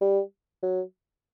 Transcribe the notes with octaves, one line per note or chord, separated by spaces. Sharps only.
G3
F#3